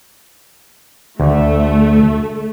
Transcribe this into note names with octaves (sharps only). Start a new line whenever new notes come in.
D2 A3